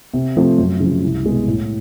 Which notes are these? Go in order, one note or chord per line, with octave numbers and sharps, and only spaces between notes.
C3
F3 A3 C4
F#2
C#3 F3
C2
B2 G#3 B3
A2